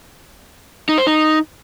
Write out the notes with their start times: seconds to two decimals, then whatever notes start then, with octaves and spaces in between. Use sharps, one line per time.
0.89 D#4
0.98 C5
1.07 D#4